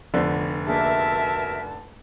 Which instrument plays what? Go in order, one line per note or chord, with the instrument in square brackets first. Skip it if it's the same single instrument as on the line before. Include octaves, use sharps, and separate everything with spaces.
[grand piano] F1 D3 [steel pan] F3 B3 C5
[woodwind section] B2 A#4 E5 [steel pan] A#3 D4 G#4 [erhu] A5